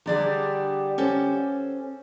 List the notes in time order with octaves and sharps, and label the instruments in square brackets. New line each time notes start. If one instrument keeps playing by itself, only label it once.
[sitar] D3 G3 [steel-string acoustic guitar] G#4 D5 A#5
[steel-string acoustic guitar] C#4 A4 C5